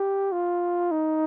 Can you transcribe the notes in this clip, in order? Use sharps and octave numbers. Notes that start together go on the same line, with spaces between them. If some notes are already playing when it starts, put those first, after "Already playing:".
Already playing: G4
F4
D#4